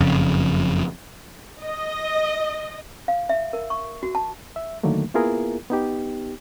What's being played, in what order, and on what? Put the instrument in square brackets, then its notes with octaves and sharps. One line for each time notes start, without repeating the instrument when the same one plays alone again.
[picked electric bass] F#1 F2 C#3
[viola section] D#5
[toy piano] F5
E5
A#4
C#6
F#4
A5
[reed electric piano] E5
D3 D#3 F#3 A3 A#3
A#3 B3 E4 F4 G#4 A#4
B3 D#4 G4